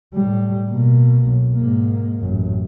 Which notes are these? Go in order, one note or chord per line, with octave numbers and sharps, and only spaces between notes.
A2 G3
B2 A#3
B1
G#2 A#3
A1 F#2